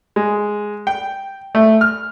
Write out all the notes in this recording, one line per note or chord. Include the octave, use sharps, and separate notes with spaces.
G#3
G5
A3
F6